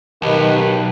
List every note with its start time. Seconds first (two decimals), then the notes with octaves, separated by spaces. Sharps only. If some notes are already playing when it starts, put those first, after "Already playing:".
0.22 B1 D#3 G4 B4